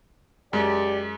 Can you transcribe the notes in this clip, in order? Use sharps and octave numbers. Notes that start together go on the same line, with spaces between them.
F#2 G#3 G4 D5